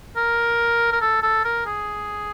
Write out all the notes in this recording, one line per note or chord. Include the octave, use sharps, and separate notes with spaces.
A#4
A#4
A4
A4
A#4
G#4